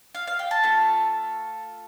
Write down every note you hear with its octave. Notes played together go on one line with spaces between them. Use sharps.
F5
F5
G5
A5
A3 F4 A4